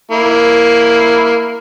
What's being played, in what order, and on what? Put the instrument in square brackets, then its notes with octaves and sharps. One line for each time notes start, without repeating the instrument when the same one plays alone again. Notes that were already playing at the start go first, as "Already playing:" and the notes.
[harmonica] A#3 E4